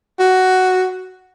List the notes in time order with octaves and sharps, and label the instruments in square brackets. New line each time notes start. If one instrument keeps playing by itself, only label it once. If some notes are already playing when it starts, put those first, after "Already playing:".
[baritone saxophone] F#4